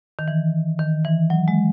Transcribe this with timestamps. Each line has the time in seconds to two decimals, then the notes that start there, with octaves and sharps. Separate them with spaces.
0.19 D#3
0.28 E3
0.79 D#3
1.05 E3
1.30 F#3
1.48 G#3